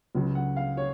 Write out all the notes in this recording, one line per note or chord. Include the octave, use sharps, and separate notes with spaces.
C#2 C#3 F#3
F#5
F5
C#5